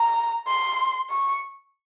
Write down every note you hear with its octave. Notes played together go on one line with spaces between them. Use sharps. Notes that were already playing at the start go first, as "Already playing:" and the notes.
Already playing: A#5
C6
C#6